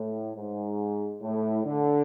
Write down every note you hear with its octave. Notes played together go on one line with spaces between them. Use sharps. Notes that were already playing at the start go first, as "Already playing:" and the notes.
Already playing: A2
G#2
A2
D3